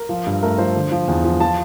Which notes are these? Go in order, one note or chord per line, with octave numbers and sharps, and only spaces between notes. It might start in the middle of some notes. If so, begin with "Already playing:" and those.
Already playing: A#4
F3
G2
A3 A#4
F3 C5
D3
F3
E2
F3
F3 A5